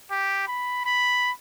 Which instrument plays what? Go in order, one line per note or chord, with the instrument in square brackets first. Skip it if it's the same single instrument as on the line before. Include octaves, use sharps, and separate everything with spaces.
[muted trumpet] G4
B5
B5